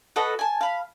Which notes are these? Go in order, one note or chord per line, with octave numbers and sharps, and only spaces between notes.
F#4 A4 B4 D#5
G#5 A5
F5 B5